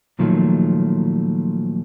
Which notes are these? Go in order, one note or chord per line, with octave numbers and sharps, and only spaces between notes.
A#2 D#3 F3 F#3 A3